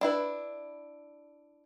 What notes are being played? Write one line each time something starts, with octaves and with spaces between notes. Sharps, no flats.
D4 E4 B4